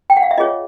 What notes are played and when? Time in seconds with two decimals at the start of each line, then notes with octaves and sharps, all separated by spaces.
0.10 G5
0.17 F#5
0.23 F5
0.31 E5
0.38 F4 G#4 C#5 D#5